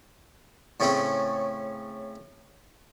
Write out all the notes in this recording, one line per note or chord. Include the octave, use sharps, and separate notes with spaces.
A2 C#3 A3 C4 C#4